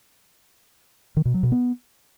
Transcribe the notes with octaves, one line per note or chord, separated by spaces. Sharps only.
D#3
B2
F#3
B2
B3